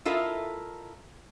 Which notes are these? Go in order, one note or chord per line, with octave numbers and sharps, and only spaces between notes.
E4 F4 A4 A#4 D#5 F5